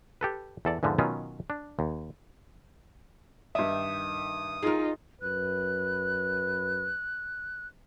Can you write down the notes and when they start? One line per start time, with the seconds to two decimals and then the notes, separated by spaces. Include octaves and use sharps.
0.21 G4 A4 B4
0.65 E2 A4 D5
0.83 E2 G#2 D3 F3
0.98 B2 D#3 F#3 B3 C#4 F4
1.50 D4
1.79 D#2
3.55 G2 D#3 E5 D#6
4.63 D#4 F4 G#4 A#4
5.22 F#2 B4 F#6